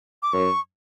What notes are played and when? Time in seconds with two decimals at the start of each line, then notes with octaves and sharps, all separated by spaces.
0.23 D6
0.33 F#2 C#6